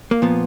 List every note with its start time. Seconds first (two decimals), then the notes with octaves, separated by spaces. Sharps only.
0.11 A#3
0.22 A#2 F3 B3